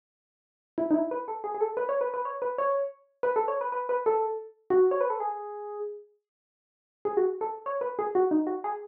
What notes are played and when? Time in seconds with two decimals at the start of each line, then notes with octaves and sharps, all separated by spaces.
0.78 E4
0.91 D#4
0.94 E4
1.11 B4
1.28 A4
1.44 G#4
1.54 G#4
1.61 A4
1.77 B4
1.89 C#5
2.01 B4
2.14 B4
2.25 C#5
2.42 B4
2.58 C#5
3.23 B4
3.36 A4
3.48 C#5
3.61 B4
3.72 B4
3.89 B4
4.06 A4
4.70 F#4
4.91 C#5
5.01 B4
5.10 A4
5.20 G#4
7.05 G#4
7.17 F#4
7.41 A4
7.66 C#5
7.81 B4
7.99 G#4
8.15 F#4
8.31 D#4
8.47 F#4
8.64 G#4